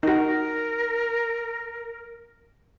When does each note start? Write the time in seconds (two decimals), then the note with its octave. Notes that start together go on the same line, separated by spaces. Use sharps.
0.03 D#4 F#4 A#4